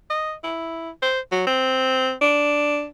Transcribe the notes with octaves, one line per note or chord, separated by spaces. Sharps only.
D#5
E4
C5
F#3
C4
D4